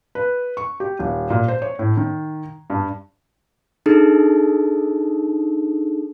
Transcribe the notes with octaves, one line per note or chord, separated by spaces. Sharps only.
B4
C#6
G4
D#1
A#2
C5
C#5
A2
D#3
G2
D4 D#4 G#4 A4